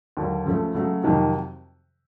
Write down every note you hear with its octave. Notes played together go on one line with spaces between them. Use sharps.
D#2 D3 F#3
C#3 F3 A3
C#3 F#3 A3
F2 C3 D#3 F#3